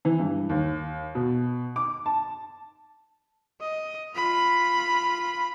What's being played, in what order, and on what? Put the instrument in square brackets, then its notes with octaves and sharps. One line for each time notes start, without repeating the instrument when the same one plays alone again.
[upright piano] E3
G2
D#2
B2
D6
A5
[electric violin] D#5
F4 B5